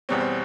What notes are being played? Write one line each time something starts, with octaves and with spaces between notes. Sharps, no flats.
E2 B2 G3 C4 C#5
C5